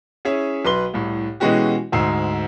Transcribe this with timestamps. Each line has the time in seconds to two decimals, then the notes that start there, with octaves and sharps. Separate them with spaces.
0.25 C#4 E4 G#4 C#5 E5
0.65 B1 B4 C6 G7
0.94 C2 A2
1.40 B2 E3 G#3 C#4 F#4 G4
1.92 D2 G#2 E6 C7